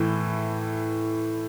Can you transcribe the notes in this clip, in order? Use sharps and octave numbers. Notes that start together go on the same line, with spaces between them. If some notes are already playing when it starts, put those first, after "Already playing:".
Already playing: A2 E3